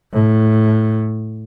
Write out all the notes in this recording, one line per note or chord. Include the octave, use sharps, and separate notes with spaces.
A2